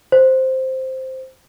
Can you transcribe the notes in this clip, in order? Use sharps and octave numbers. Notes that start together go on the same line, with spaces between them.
C5